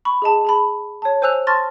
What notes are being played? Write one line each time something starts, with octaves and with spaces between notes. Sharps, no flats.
B5 C#6
G#4 D#5 A5
G#4 A5 B5
C#5 A5
C5 G#5 E6 F#6 F7
A5 C6 C#6 F6 A6 A#6